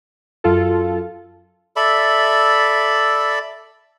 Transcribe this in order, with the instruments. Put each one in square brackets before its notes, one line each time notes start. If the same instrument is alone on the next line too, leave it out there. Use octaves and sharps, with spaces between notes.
[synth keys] F#2 F4 A4
[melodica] A4 D5 E5 B5